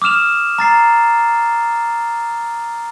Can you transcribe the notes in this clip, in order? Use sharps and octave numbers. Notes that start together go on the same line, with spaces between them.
D6 D#6 F6 E7 F7
A#5 A6 C7